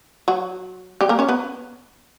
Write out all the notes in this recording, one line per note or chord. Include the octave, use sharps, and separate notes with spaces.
F#3 F#4
G3 G4
A#3 A#4
C#4 C#5
B3 B4